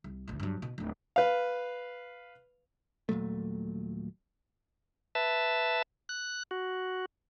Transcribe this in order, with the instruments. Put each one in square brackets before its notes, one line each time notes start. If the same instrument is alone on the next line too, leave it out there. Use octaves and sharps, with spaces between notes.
[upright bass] C2
A1 D2
G2 F#3
B2
D1 D4
[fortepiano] B4 F5
[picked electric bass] D#1 A#2 F#3 A3
[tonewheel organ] B4 E5 A5
F#6
F#4